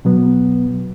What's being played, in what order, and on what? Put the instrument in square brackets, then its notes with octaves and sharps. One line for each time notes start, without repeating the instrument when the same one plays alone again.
[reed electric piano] B2 F#3 B3